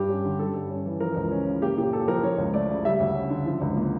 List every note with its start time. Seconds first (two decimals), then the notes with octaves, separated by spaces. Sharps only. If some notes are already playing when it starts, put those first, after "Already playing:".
Already playing: G2 G3 G4
0.09 C#4
0.24 D3
0.39 G3 A4
0.55 G2
0.70 C#4
0.86 E3
1.00 F3 A#4
1.16 C#2
1.31 C#4
1.46 C#3
1.62 A#3 G4
1.77 A#2 G4
1.93 C#4 A4
2.08 F3 A#4
2.23 F3 C#5
2.38 C#2
2.54 A3 D5
2.69 C#3
2.85 G3 E5
3.00 D2
3.15 C#4
3.30 D3
3.46 F3
3.61 C#2
3.77 A#3